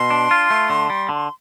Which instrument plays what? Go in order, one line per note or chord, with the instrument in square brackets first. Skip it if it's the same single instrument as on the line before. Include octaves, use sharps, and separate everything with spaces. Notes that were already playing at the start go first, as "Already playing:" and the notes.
Already playing: [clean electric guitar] B2 [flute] C6
[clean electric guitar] D4
F4
A3
D3
G3
D3